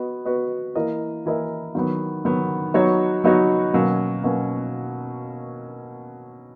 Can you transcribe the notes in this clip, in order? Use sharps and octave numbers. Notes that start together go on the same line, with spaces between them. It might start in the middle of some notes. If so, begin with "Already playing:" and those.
Already playing: B3 F#4 B4 D#5
B3 F#4 B4 D#5
E3 A#3 E4 A#4 D#5
E3 A#3 E4 A#4 D#5
D#3 F#3 B3
D#3 F#3 B3
F#3 B3 D#4 F#4 C#5
F#3 B3 D#4 F#4 C#5
B2 F#3 A#3 C#4
B2 F#3 A#3 C#4